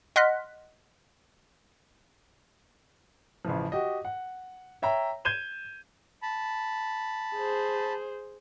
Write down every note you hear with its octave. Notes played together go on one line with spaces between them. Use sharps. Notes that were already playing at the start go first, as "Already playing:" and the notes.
D#5 F#5 C6 F6 F#6 B6
A1 C#3 E3 F3
F#4 G4 D#5
F#5
C#5 E5 G5 A#5
G6 G#6 D#7 E7 G7
A5 B5
G#4 C5